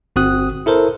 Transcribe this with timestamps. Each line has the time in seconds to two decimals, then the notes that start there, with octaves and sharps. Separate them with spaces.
0.16 G1 C4 F#4 D#6 F#6
0.66 E4 A4 A#4 C5